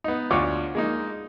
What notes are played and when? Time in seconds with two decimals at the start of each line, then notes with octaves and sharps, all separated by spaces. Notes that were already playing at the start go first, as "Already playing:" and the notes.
0.04 B3 D#4
0.31 D2 F4 F#4 C#5 C6 D6
0.75 G#3 A#3 D#4